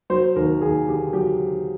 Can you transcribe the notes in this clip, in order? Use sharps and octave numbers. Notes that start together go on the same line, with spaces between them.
F#3 C5
D#2 A#4
D#2 G#4
D3 G4
F#3 G4